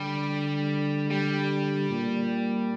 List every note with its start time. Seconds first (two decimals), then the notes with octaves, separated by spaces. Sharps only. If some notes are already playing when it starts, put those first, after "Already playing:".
Already playing: D3 G3
1.11 G3
1.90 A#2